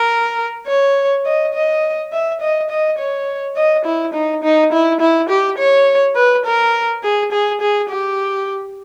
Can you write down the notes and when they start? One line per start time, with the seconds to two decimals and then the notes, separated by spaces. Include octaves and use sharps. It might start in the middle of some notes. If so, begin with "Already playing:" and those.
Already playing: A#4
0.68 C#5
1.26 D#5
1.54 D#5
2.12 E5
2.41 D#5
2.70 D#5
2.99 C#5
3.56 D#5
3.85 E4
4.14 D#4
4.43 D#4
4.72 E4
5.01 E4
5.29 G4
5.58 C#5
6.16 B4
6.45 A#4
7.03 G#4
7.32 G#4
7.61 G#4
7.90 G4